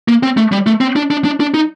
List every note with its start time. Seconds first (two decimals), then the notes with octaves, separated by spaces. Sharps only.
0.08 A#3
0.23 C4
0.37 A3
0.52 G3
0.66 A3
0.81 C4
0.96 D4
1.10 D4
1.25 D4
1.40 D4
1.54 D#4